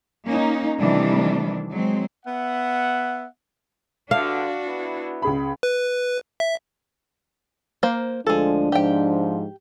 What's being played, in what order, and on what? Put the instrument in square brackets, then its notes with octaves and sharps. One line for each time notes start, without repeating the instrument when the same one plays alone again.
[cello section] A#3 C#4 D#4
C3 D#3 E3 G3 A3 D4
F#3 G#3 C4
[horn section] B3 E5 F#5
[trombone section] G2 D3 [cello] D4 F#4 [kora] F5
[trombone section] B3 E4
[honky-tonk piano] C#2 G#4 B5
[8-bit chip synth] B4
E5
[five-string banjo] A#3 C5
[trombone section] D2 F3 G#3 [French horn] D4 [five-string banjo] G#4 A4
[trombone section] G#2 F3 [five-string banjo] G4 G5